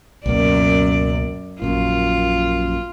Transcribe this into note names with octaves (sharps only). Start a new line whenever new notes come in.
C#2 F#2 B2 A#3 D5
A#1 F#2 A#2 F4